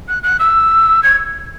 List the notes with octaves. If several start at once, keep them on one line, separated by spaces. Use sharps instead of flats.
F#6
F#6
E6
G#6